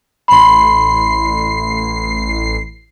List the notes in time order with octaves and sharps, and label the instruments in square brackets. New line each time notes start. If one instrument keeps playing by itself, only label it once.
[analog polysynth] A1 C7 [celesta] B5 C6